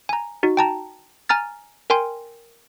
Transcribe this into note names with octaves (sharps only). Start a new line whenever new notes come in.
G#5 A#5
D#4 F#4
G5 A5 A#5
G#5 A#5 F6 A6
A#4 G5 G#5 C6